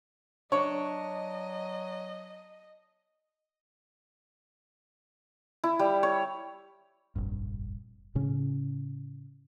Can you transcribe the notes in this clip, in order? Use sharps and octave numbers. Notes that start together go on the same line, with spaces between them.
F#3 D4 C#5 D#5
E4
G3
C#5
F1 A#1 G2
A2 C#3 C#4